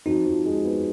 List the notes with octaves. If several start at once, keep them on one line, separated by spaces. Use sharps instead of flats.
F2 D#4 F#4
F3
G#3
B3